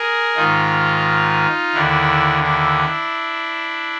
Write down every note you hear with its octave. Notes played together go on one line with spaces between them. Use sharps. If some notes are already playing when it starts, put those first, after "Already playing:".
Already playing: G#4 A#4
G#2 D#3 D#4 F4
D#2 D3 D4 E4
D4 E4